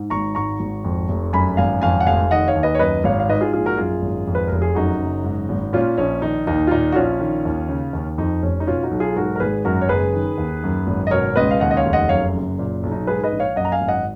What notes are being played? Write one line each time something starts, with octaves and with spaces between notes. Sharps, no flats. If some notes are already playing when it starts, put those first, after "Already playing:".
Already playing: G#2
G#1 A#5 C#6
G#2 A#5 C#6
G#1
F2
F1
F#2 G#5 B5
G#1 F5 G#5
F2 F5 G#5
F#5
F1 F5 G#5
D#3 D#5 F#5
C#5 F5
D#2
B4 D#5
C#5
F#2 B4 D#5
G#1 C#5 F5
F5
G#2 B4 D#5
F4 G#4
A#1 F4 G#4
F#4 A#4
F#2 F4 G#4
G#1
F2
B4
F1 A#4
G#4
F#2 D#4 F#4
F#1
G#2
G#1
A#2 C#4 F4
A#1 C#4
D#3 D#4
D#2 D#4
F4
A#2 D#4
F#4
A#1 C#4 F4
D#3
D#2
C#3
D#2
F2 D#4
F1 C#4
D#4
B2 C#4 F4
D#4 F#4
B1
F4 G#4
G#2 F#4 A#4
A#4
G#1 G#4 B4
F#2 F#4 A#4
C#5
F#1 G#4 B4
D#3
D#2
F#2
G#1
D#5
B2 A#4 C#5
C#2 B4 D#5
F5
D#2 D#5 F#5
D#5
C#5 F5
F1
D#5 F#5
F#2 C#5 F5
F#1
A#2
B1
D#4
G#2 G#4 B4
B4 D#5
A#1
C#5 F5
F#2 D#5 F#5
A#5
F5 G#5
G#1
D#5 F#5